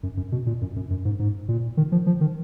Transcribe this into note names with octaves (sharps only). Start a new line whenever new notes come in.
F#2
F#2
B2
A#2
F#2
F#2
F#2
G#2
G#2
A#2
D#3
F3
F3
D#3